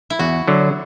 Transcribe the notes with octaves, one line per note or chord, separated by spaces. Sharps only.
E4
E2 F#4
D3 F#3